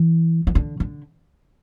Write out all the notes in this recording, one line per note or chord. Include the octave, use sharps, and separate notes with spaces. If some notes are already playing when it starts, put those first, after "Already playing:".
Already playing: E3
E3
D3
D3